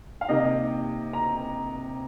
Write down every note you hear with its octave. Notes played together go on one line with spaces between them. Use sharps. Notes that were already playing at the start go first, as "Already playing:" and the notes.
F5
C3 D#3 A#3 D#5
A#5